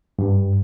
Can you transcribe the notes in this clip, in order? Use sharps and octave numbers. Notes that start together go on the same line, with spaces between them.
G2